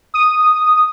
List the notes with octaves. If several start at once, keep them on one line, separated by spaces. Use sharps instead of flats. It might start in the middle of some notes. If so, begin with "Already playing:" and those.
D#6